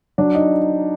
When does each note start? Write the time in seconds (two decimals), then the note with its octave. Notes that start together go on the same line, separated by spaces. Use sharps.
0.18 F#3 D4
0.35 D#4